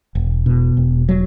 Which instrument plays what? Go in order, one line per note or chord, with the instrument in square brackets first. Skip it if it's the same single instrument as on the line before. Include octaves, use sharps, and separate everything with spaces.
[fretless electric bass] E1
B2
E1
F#3